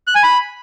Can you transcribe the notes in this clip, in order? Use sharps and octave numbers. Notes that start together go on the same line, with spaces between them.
F#6
G#5
B5